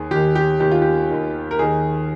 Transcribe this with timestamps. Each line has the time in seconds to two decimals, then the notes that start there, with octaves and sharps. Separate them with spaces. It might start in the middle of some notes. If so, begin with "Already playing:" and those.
Already playing: D#2 D#3 G#4
0.11 D#2 D#3 G4
0.35 G4
0.60 D#2 D#3 G4
0.71 F4
0.82 G4
1.10 D#2 D#3
1.51 A#4
1.59 D#2 D#3 G#4